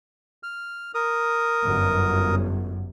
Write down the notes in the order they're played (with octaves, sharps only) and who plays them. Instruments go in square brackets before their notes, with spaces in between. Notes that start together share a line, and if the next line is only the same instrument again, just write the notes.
[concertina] F6
A#4 D#6
[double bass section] G1 F#2